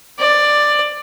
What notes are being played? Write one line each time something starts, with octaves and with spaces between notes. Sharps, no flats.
D5